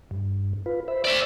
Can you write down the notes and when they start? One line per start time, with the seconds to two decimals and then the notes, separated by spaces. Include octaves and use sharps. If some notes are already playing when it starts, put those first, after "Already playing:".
0.11 G2
0.66 F4 B4
0.88 C5 E5 B5
1.05 C5 D5 E5